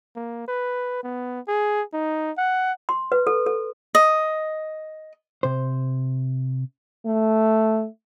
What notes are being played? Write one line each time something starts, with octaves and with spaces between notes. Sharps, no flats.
A#3
B4
B3
G#4
D#4
F#5
C6
B4
A4
A4
D#5
C3 C5
A3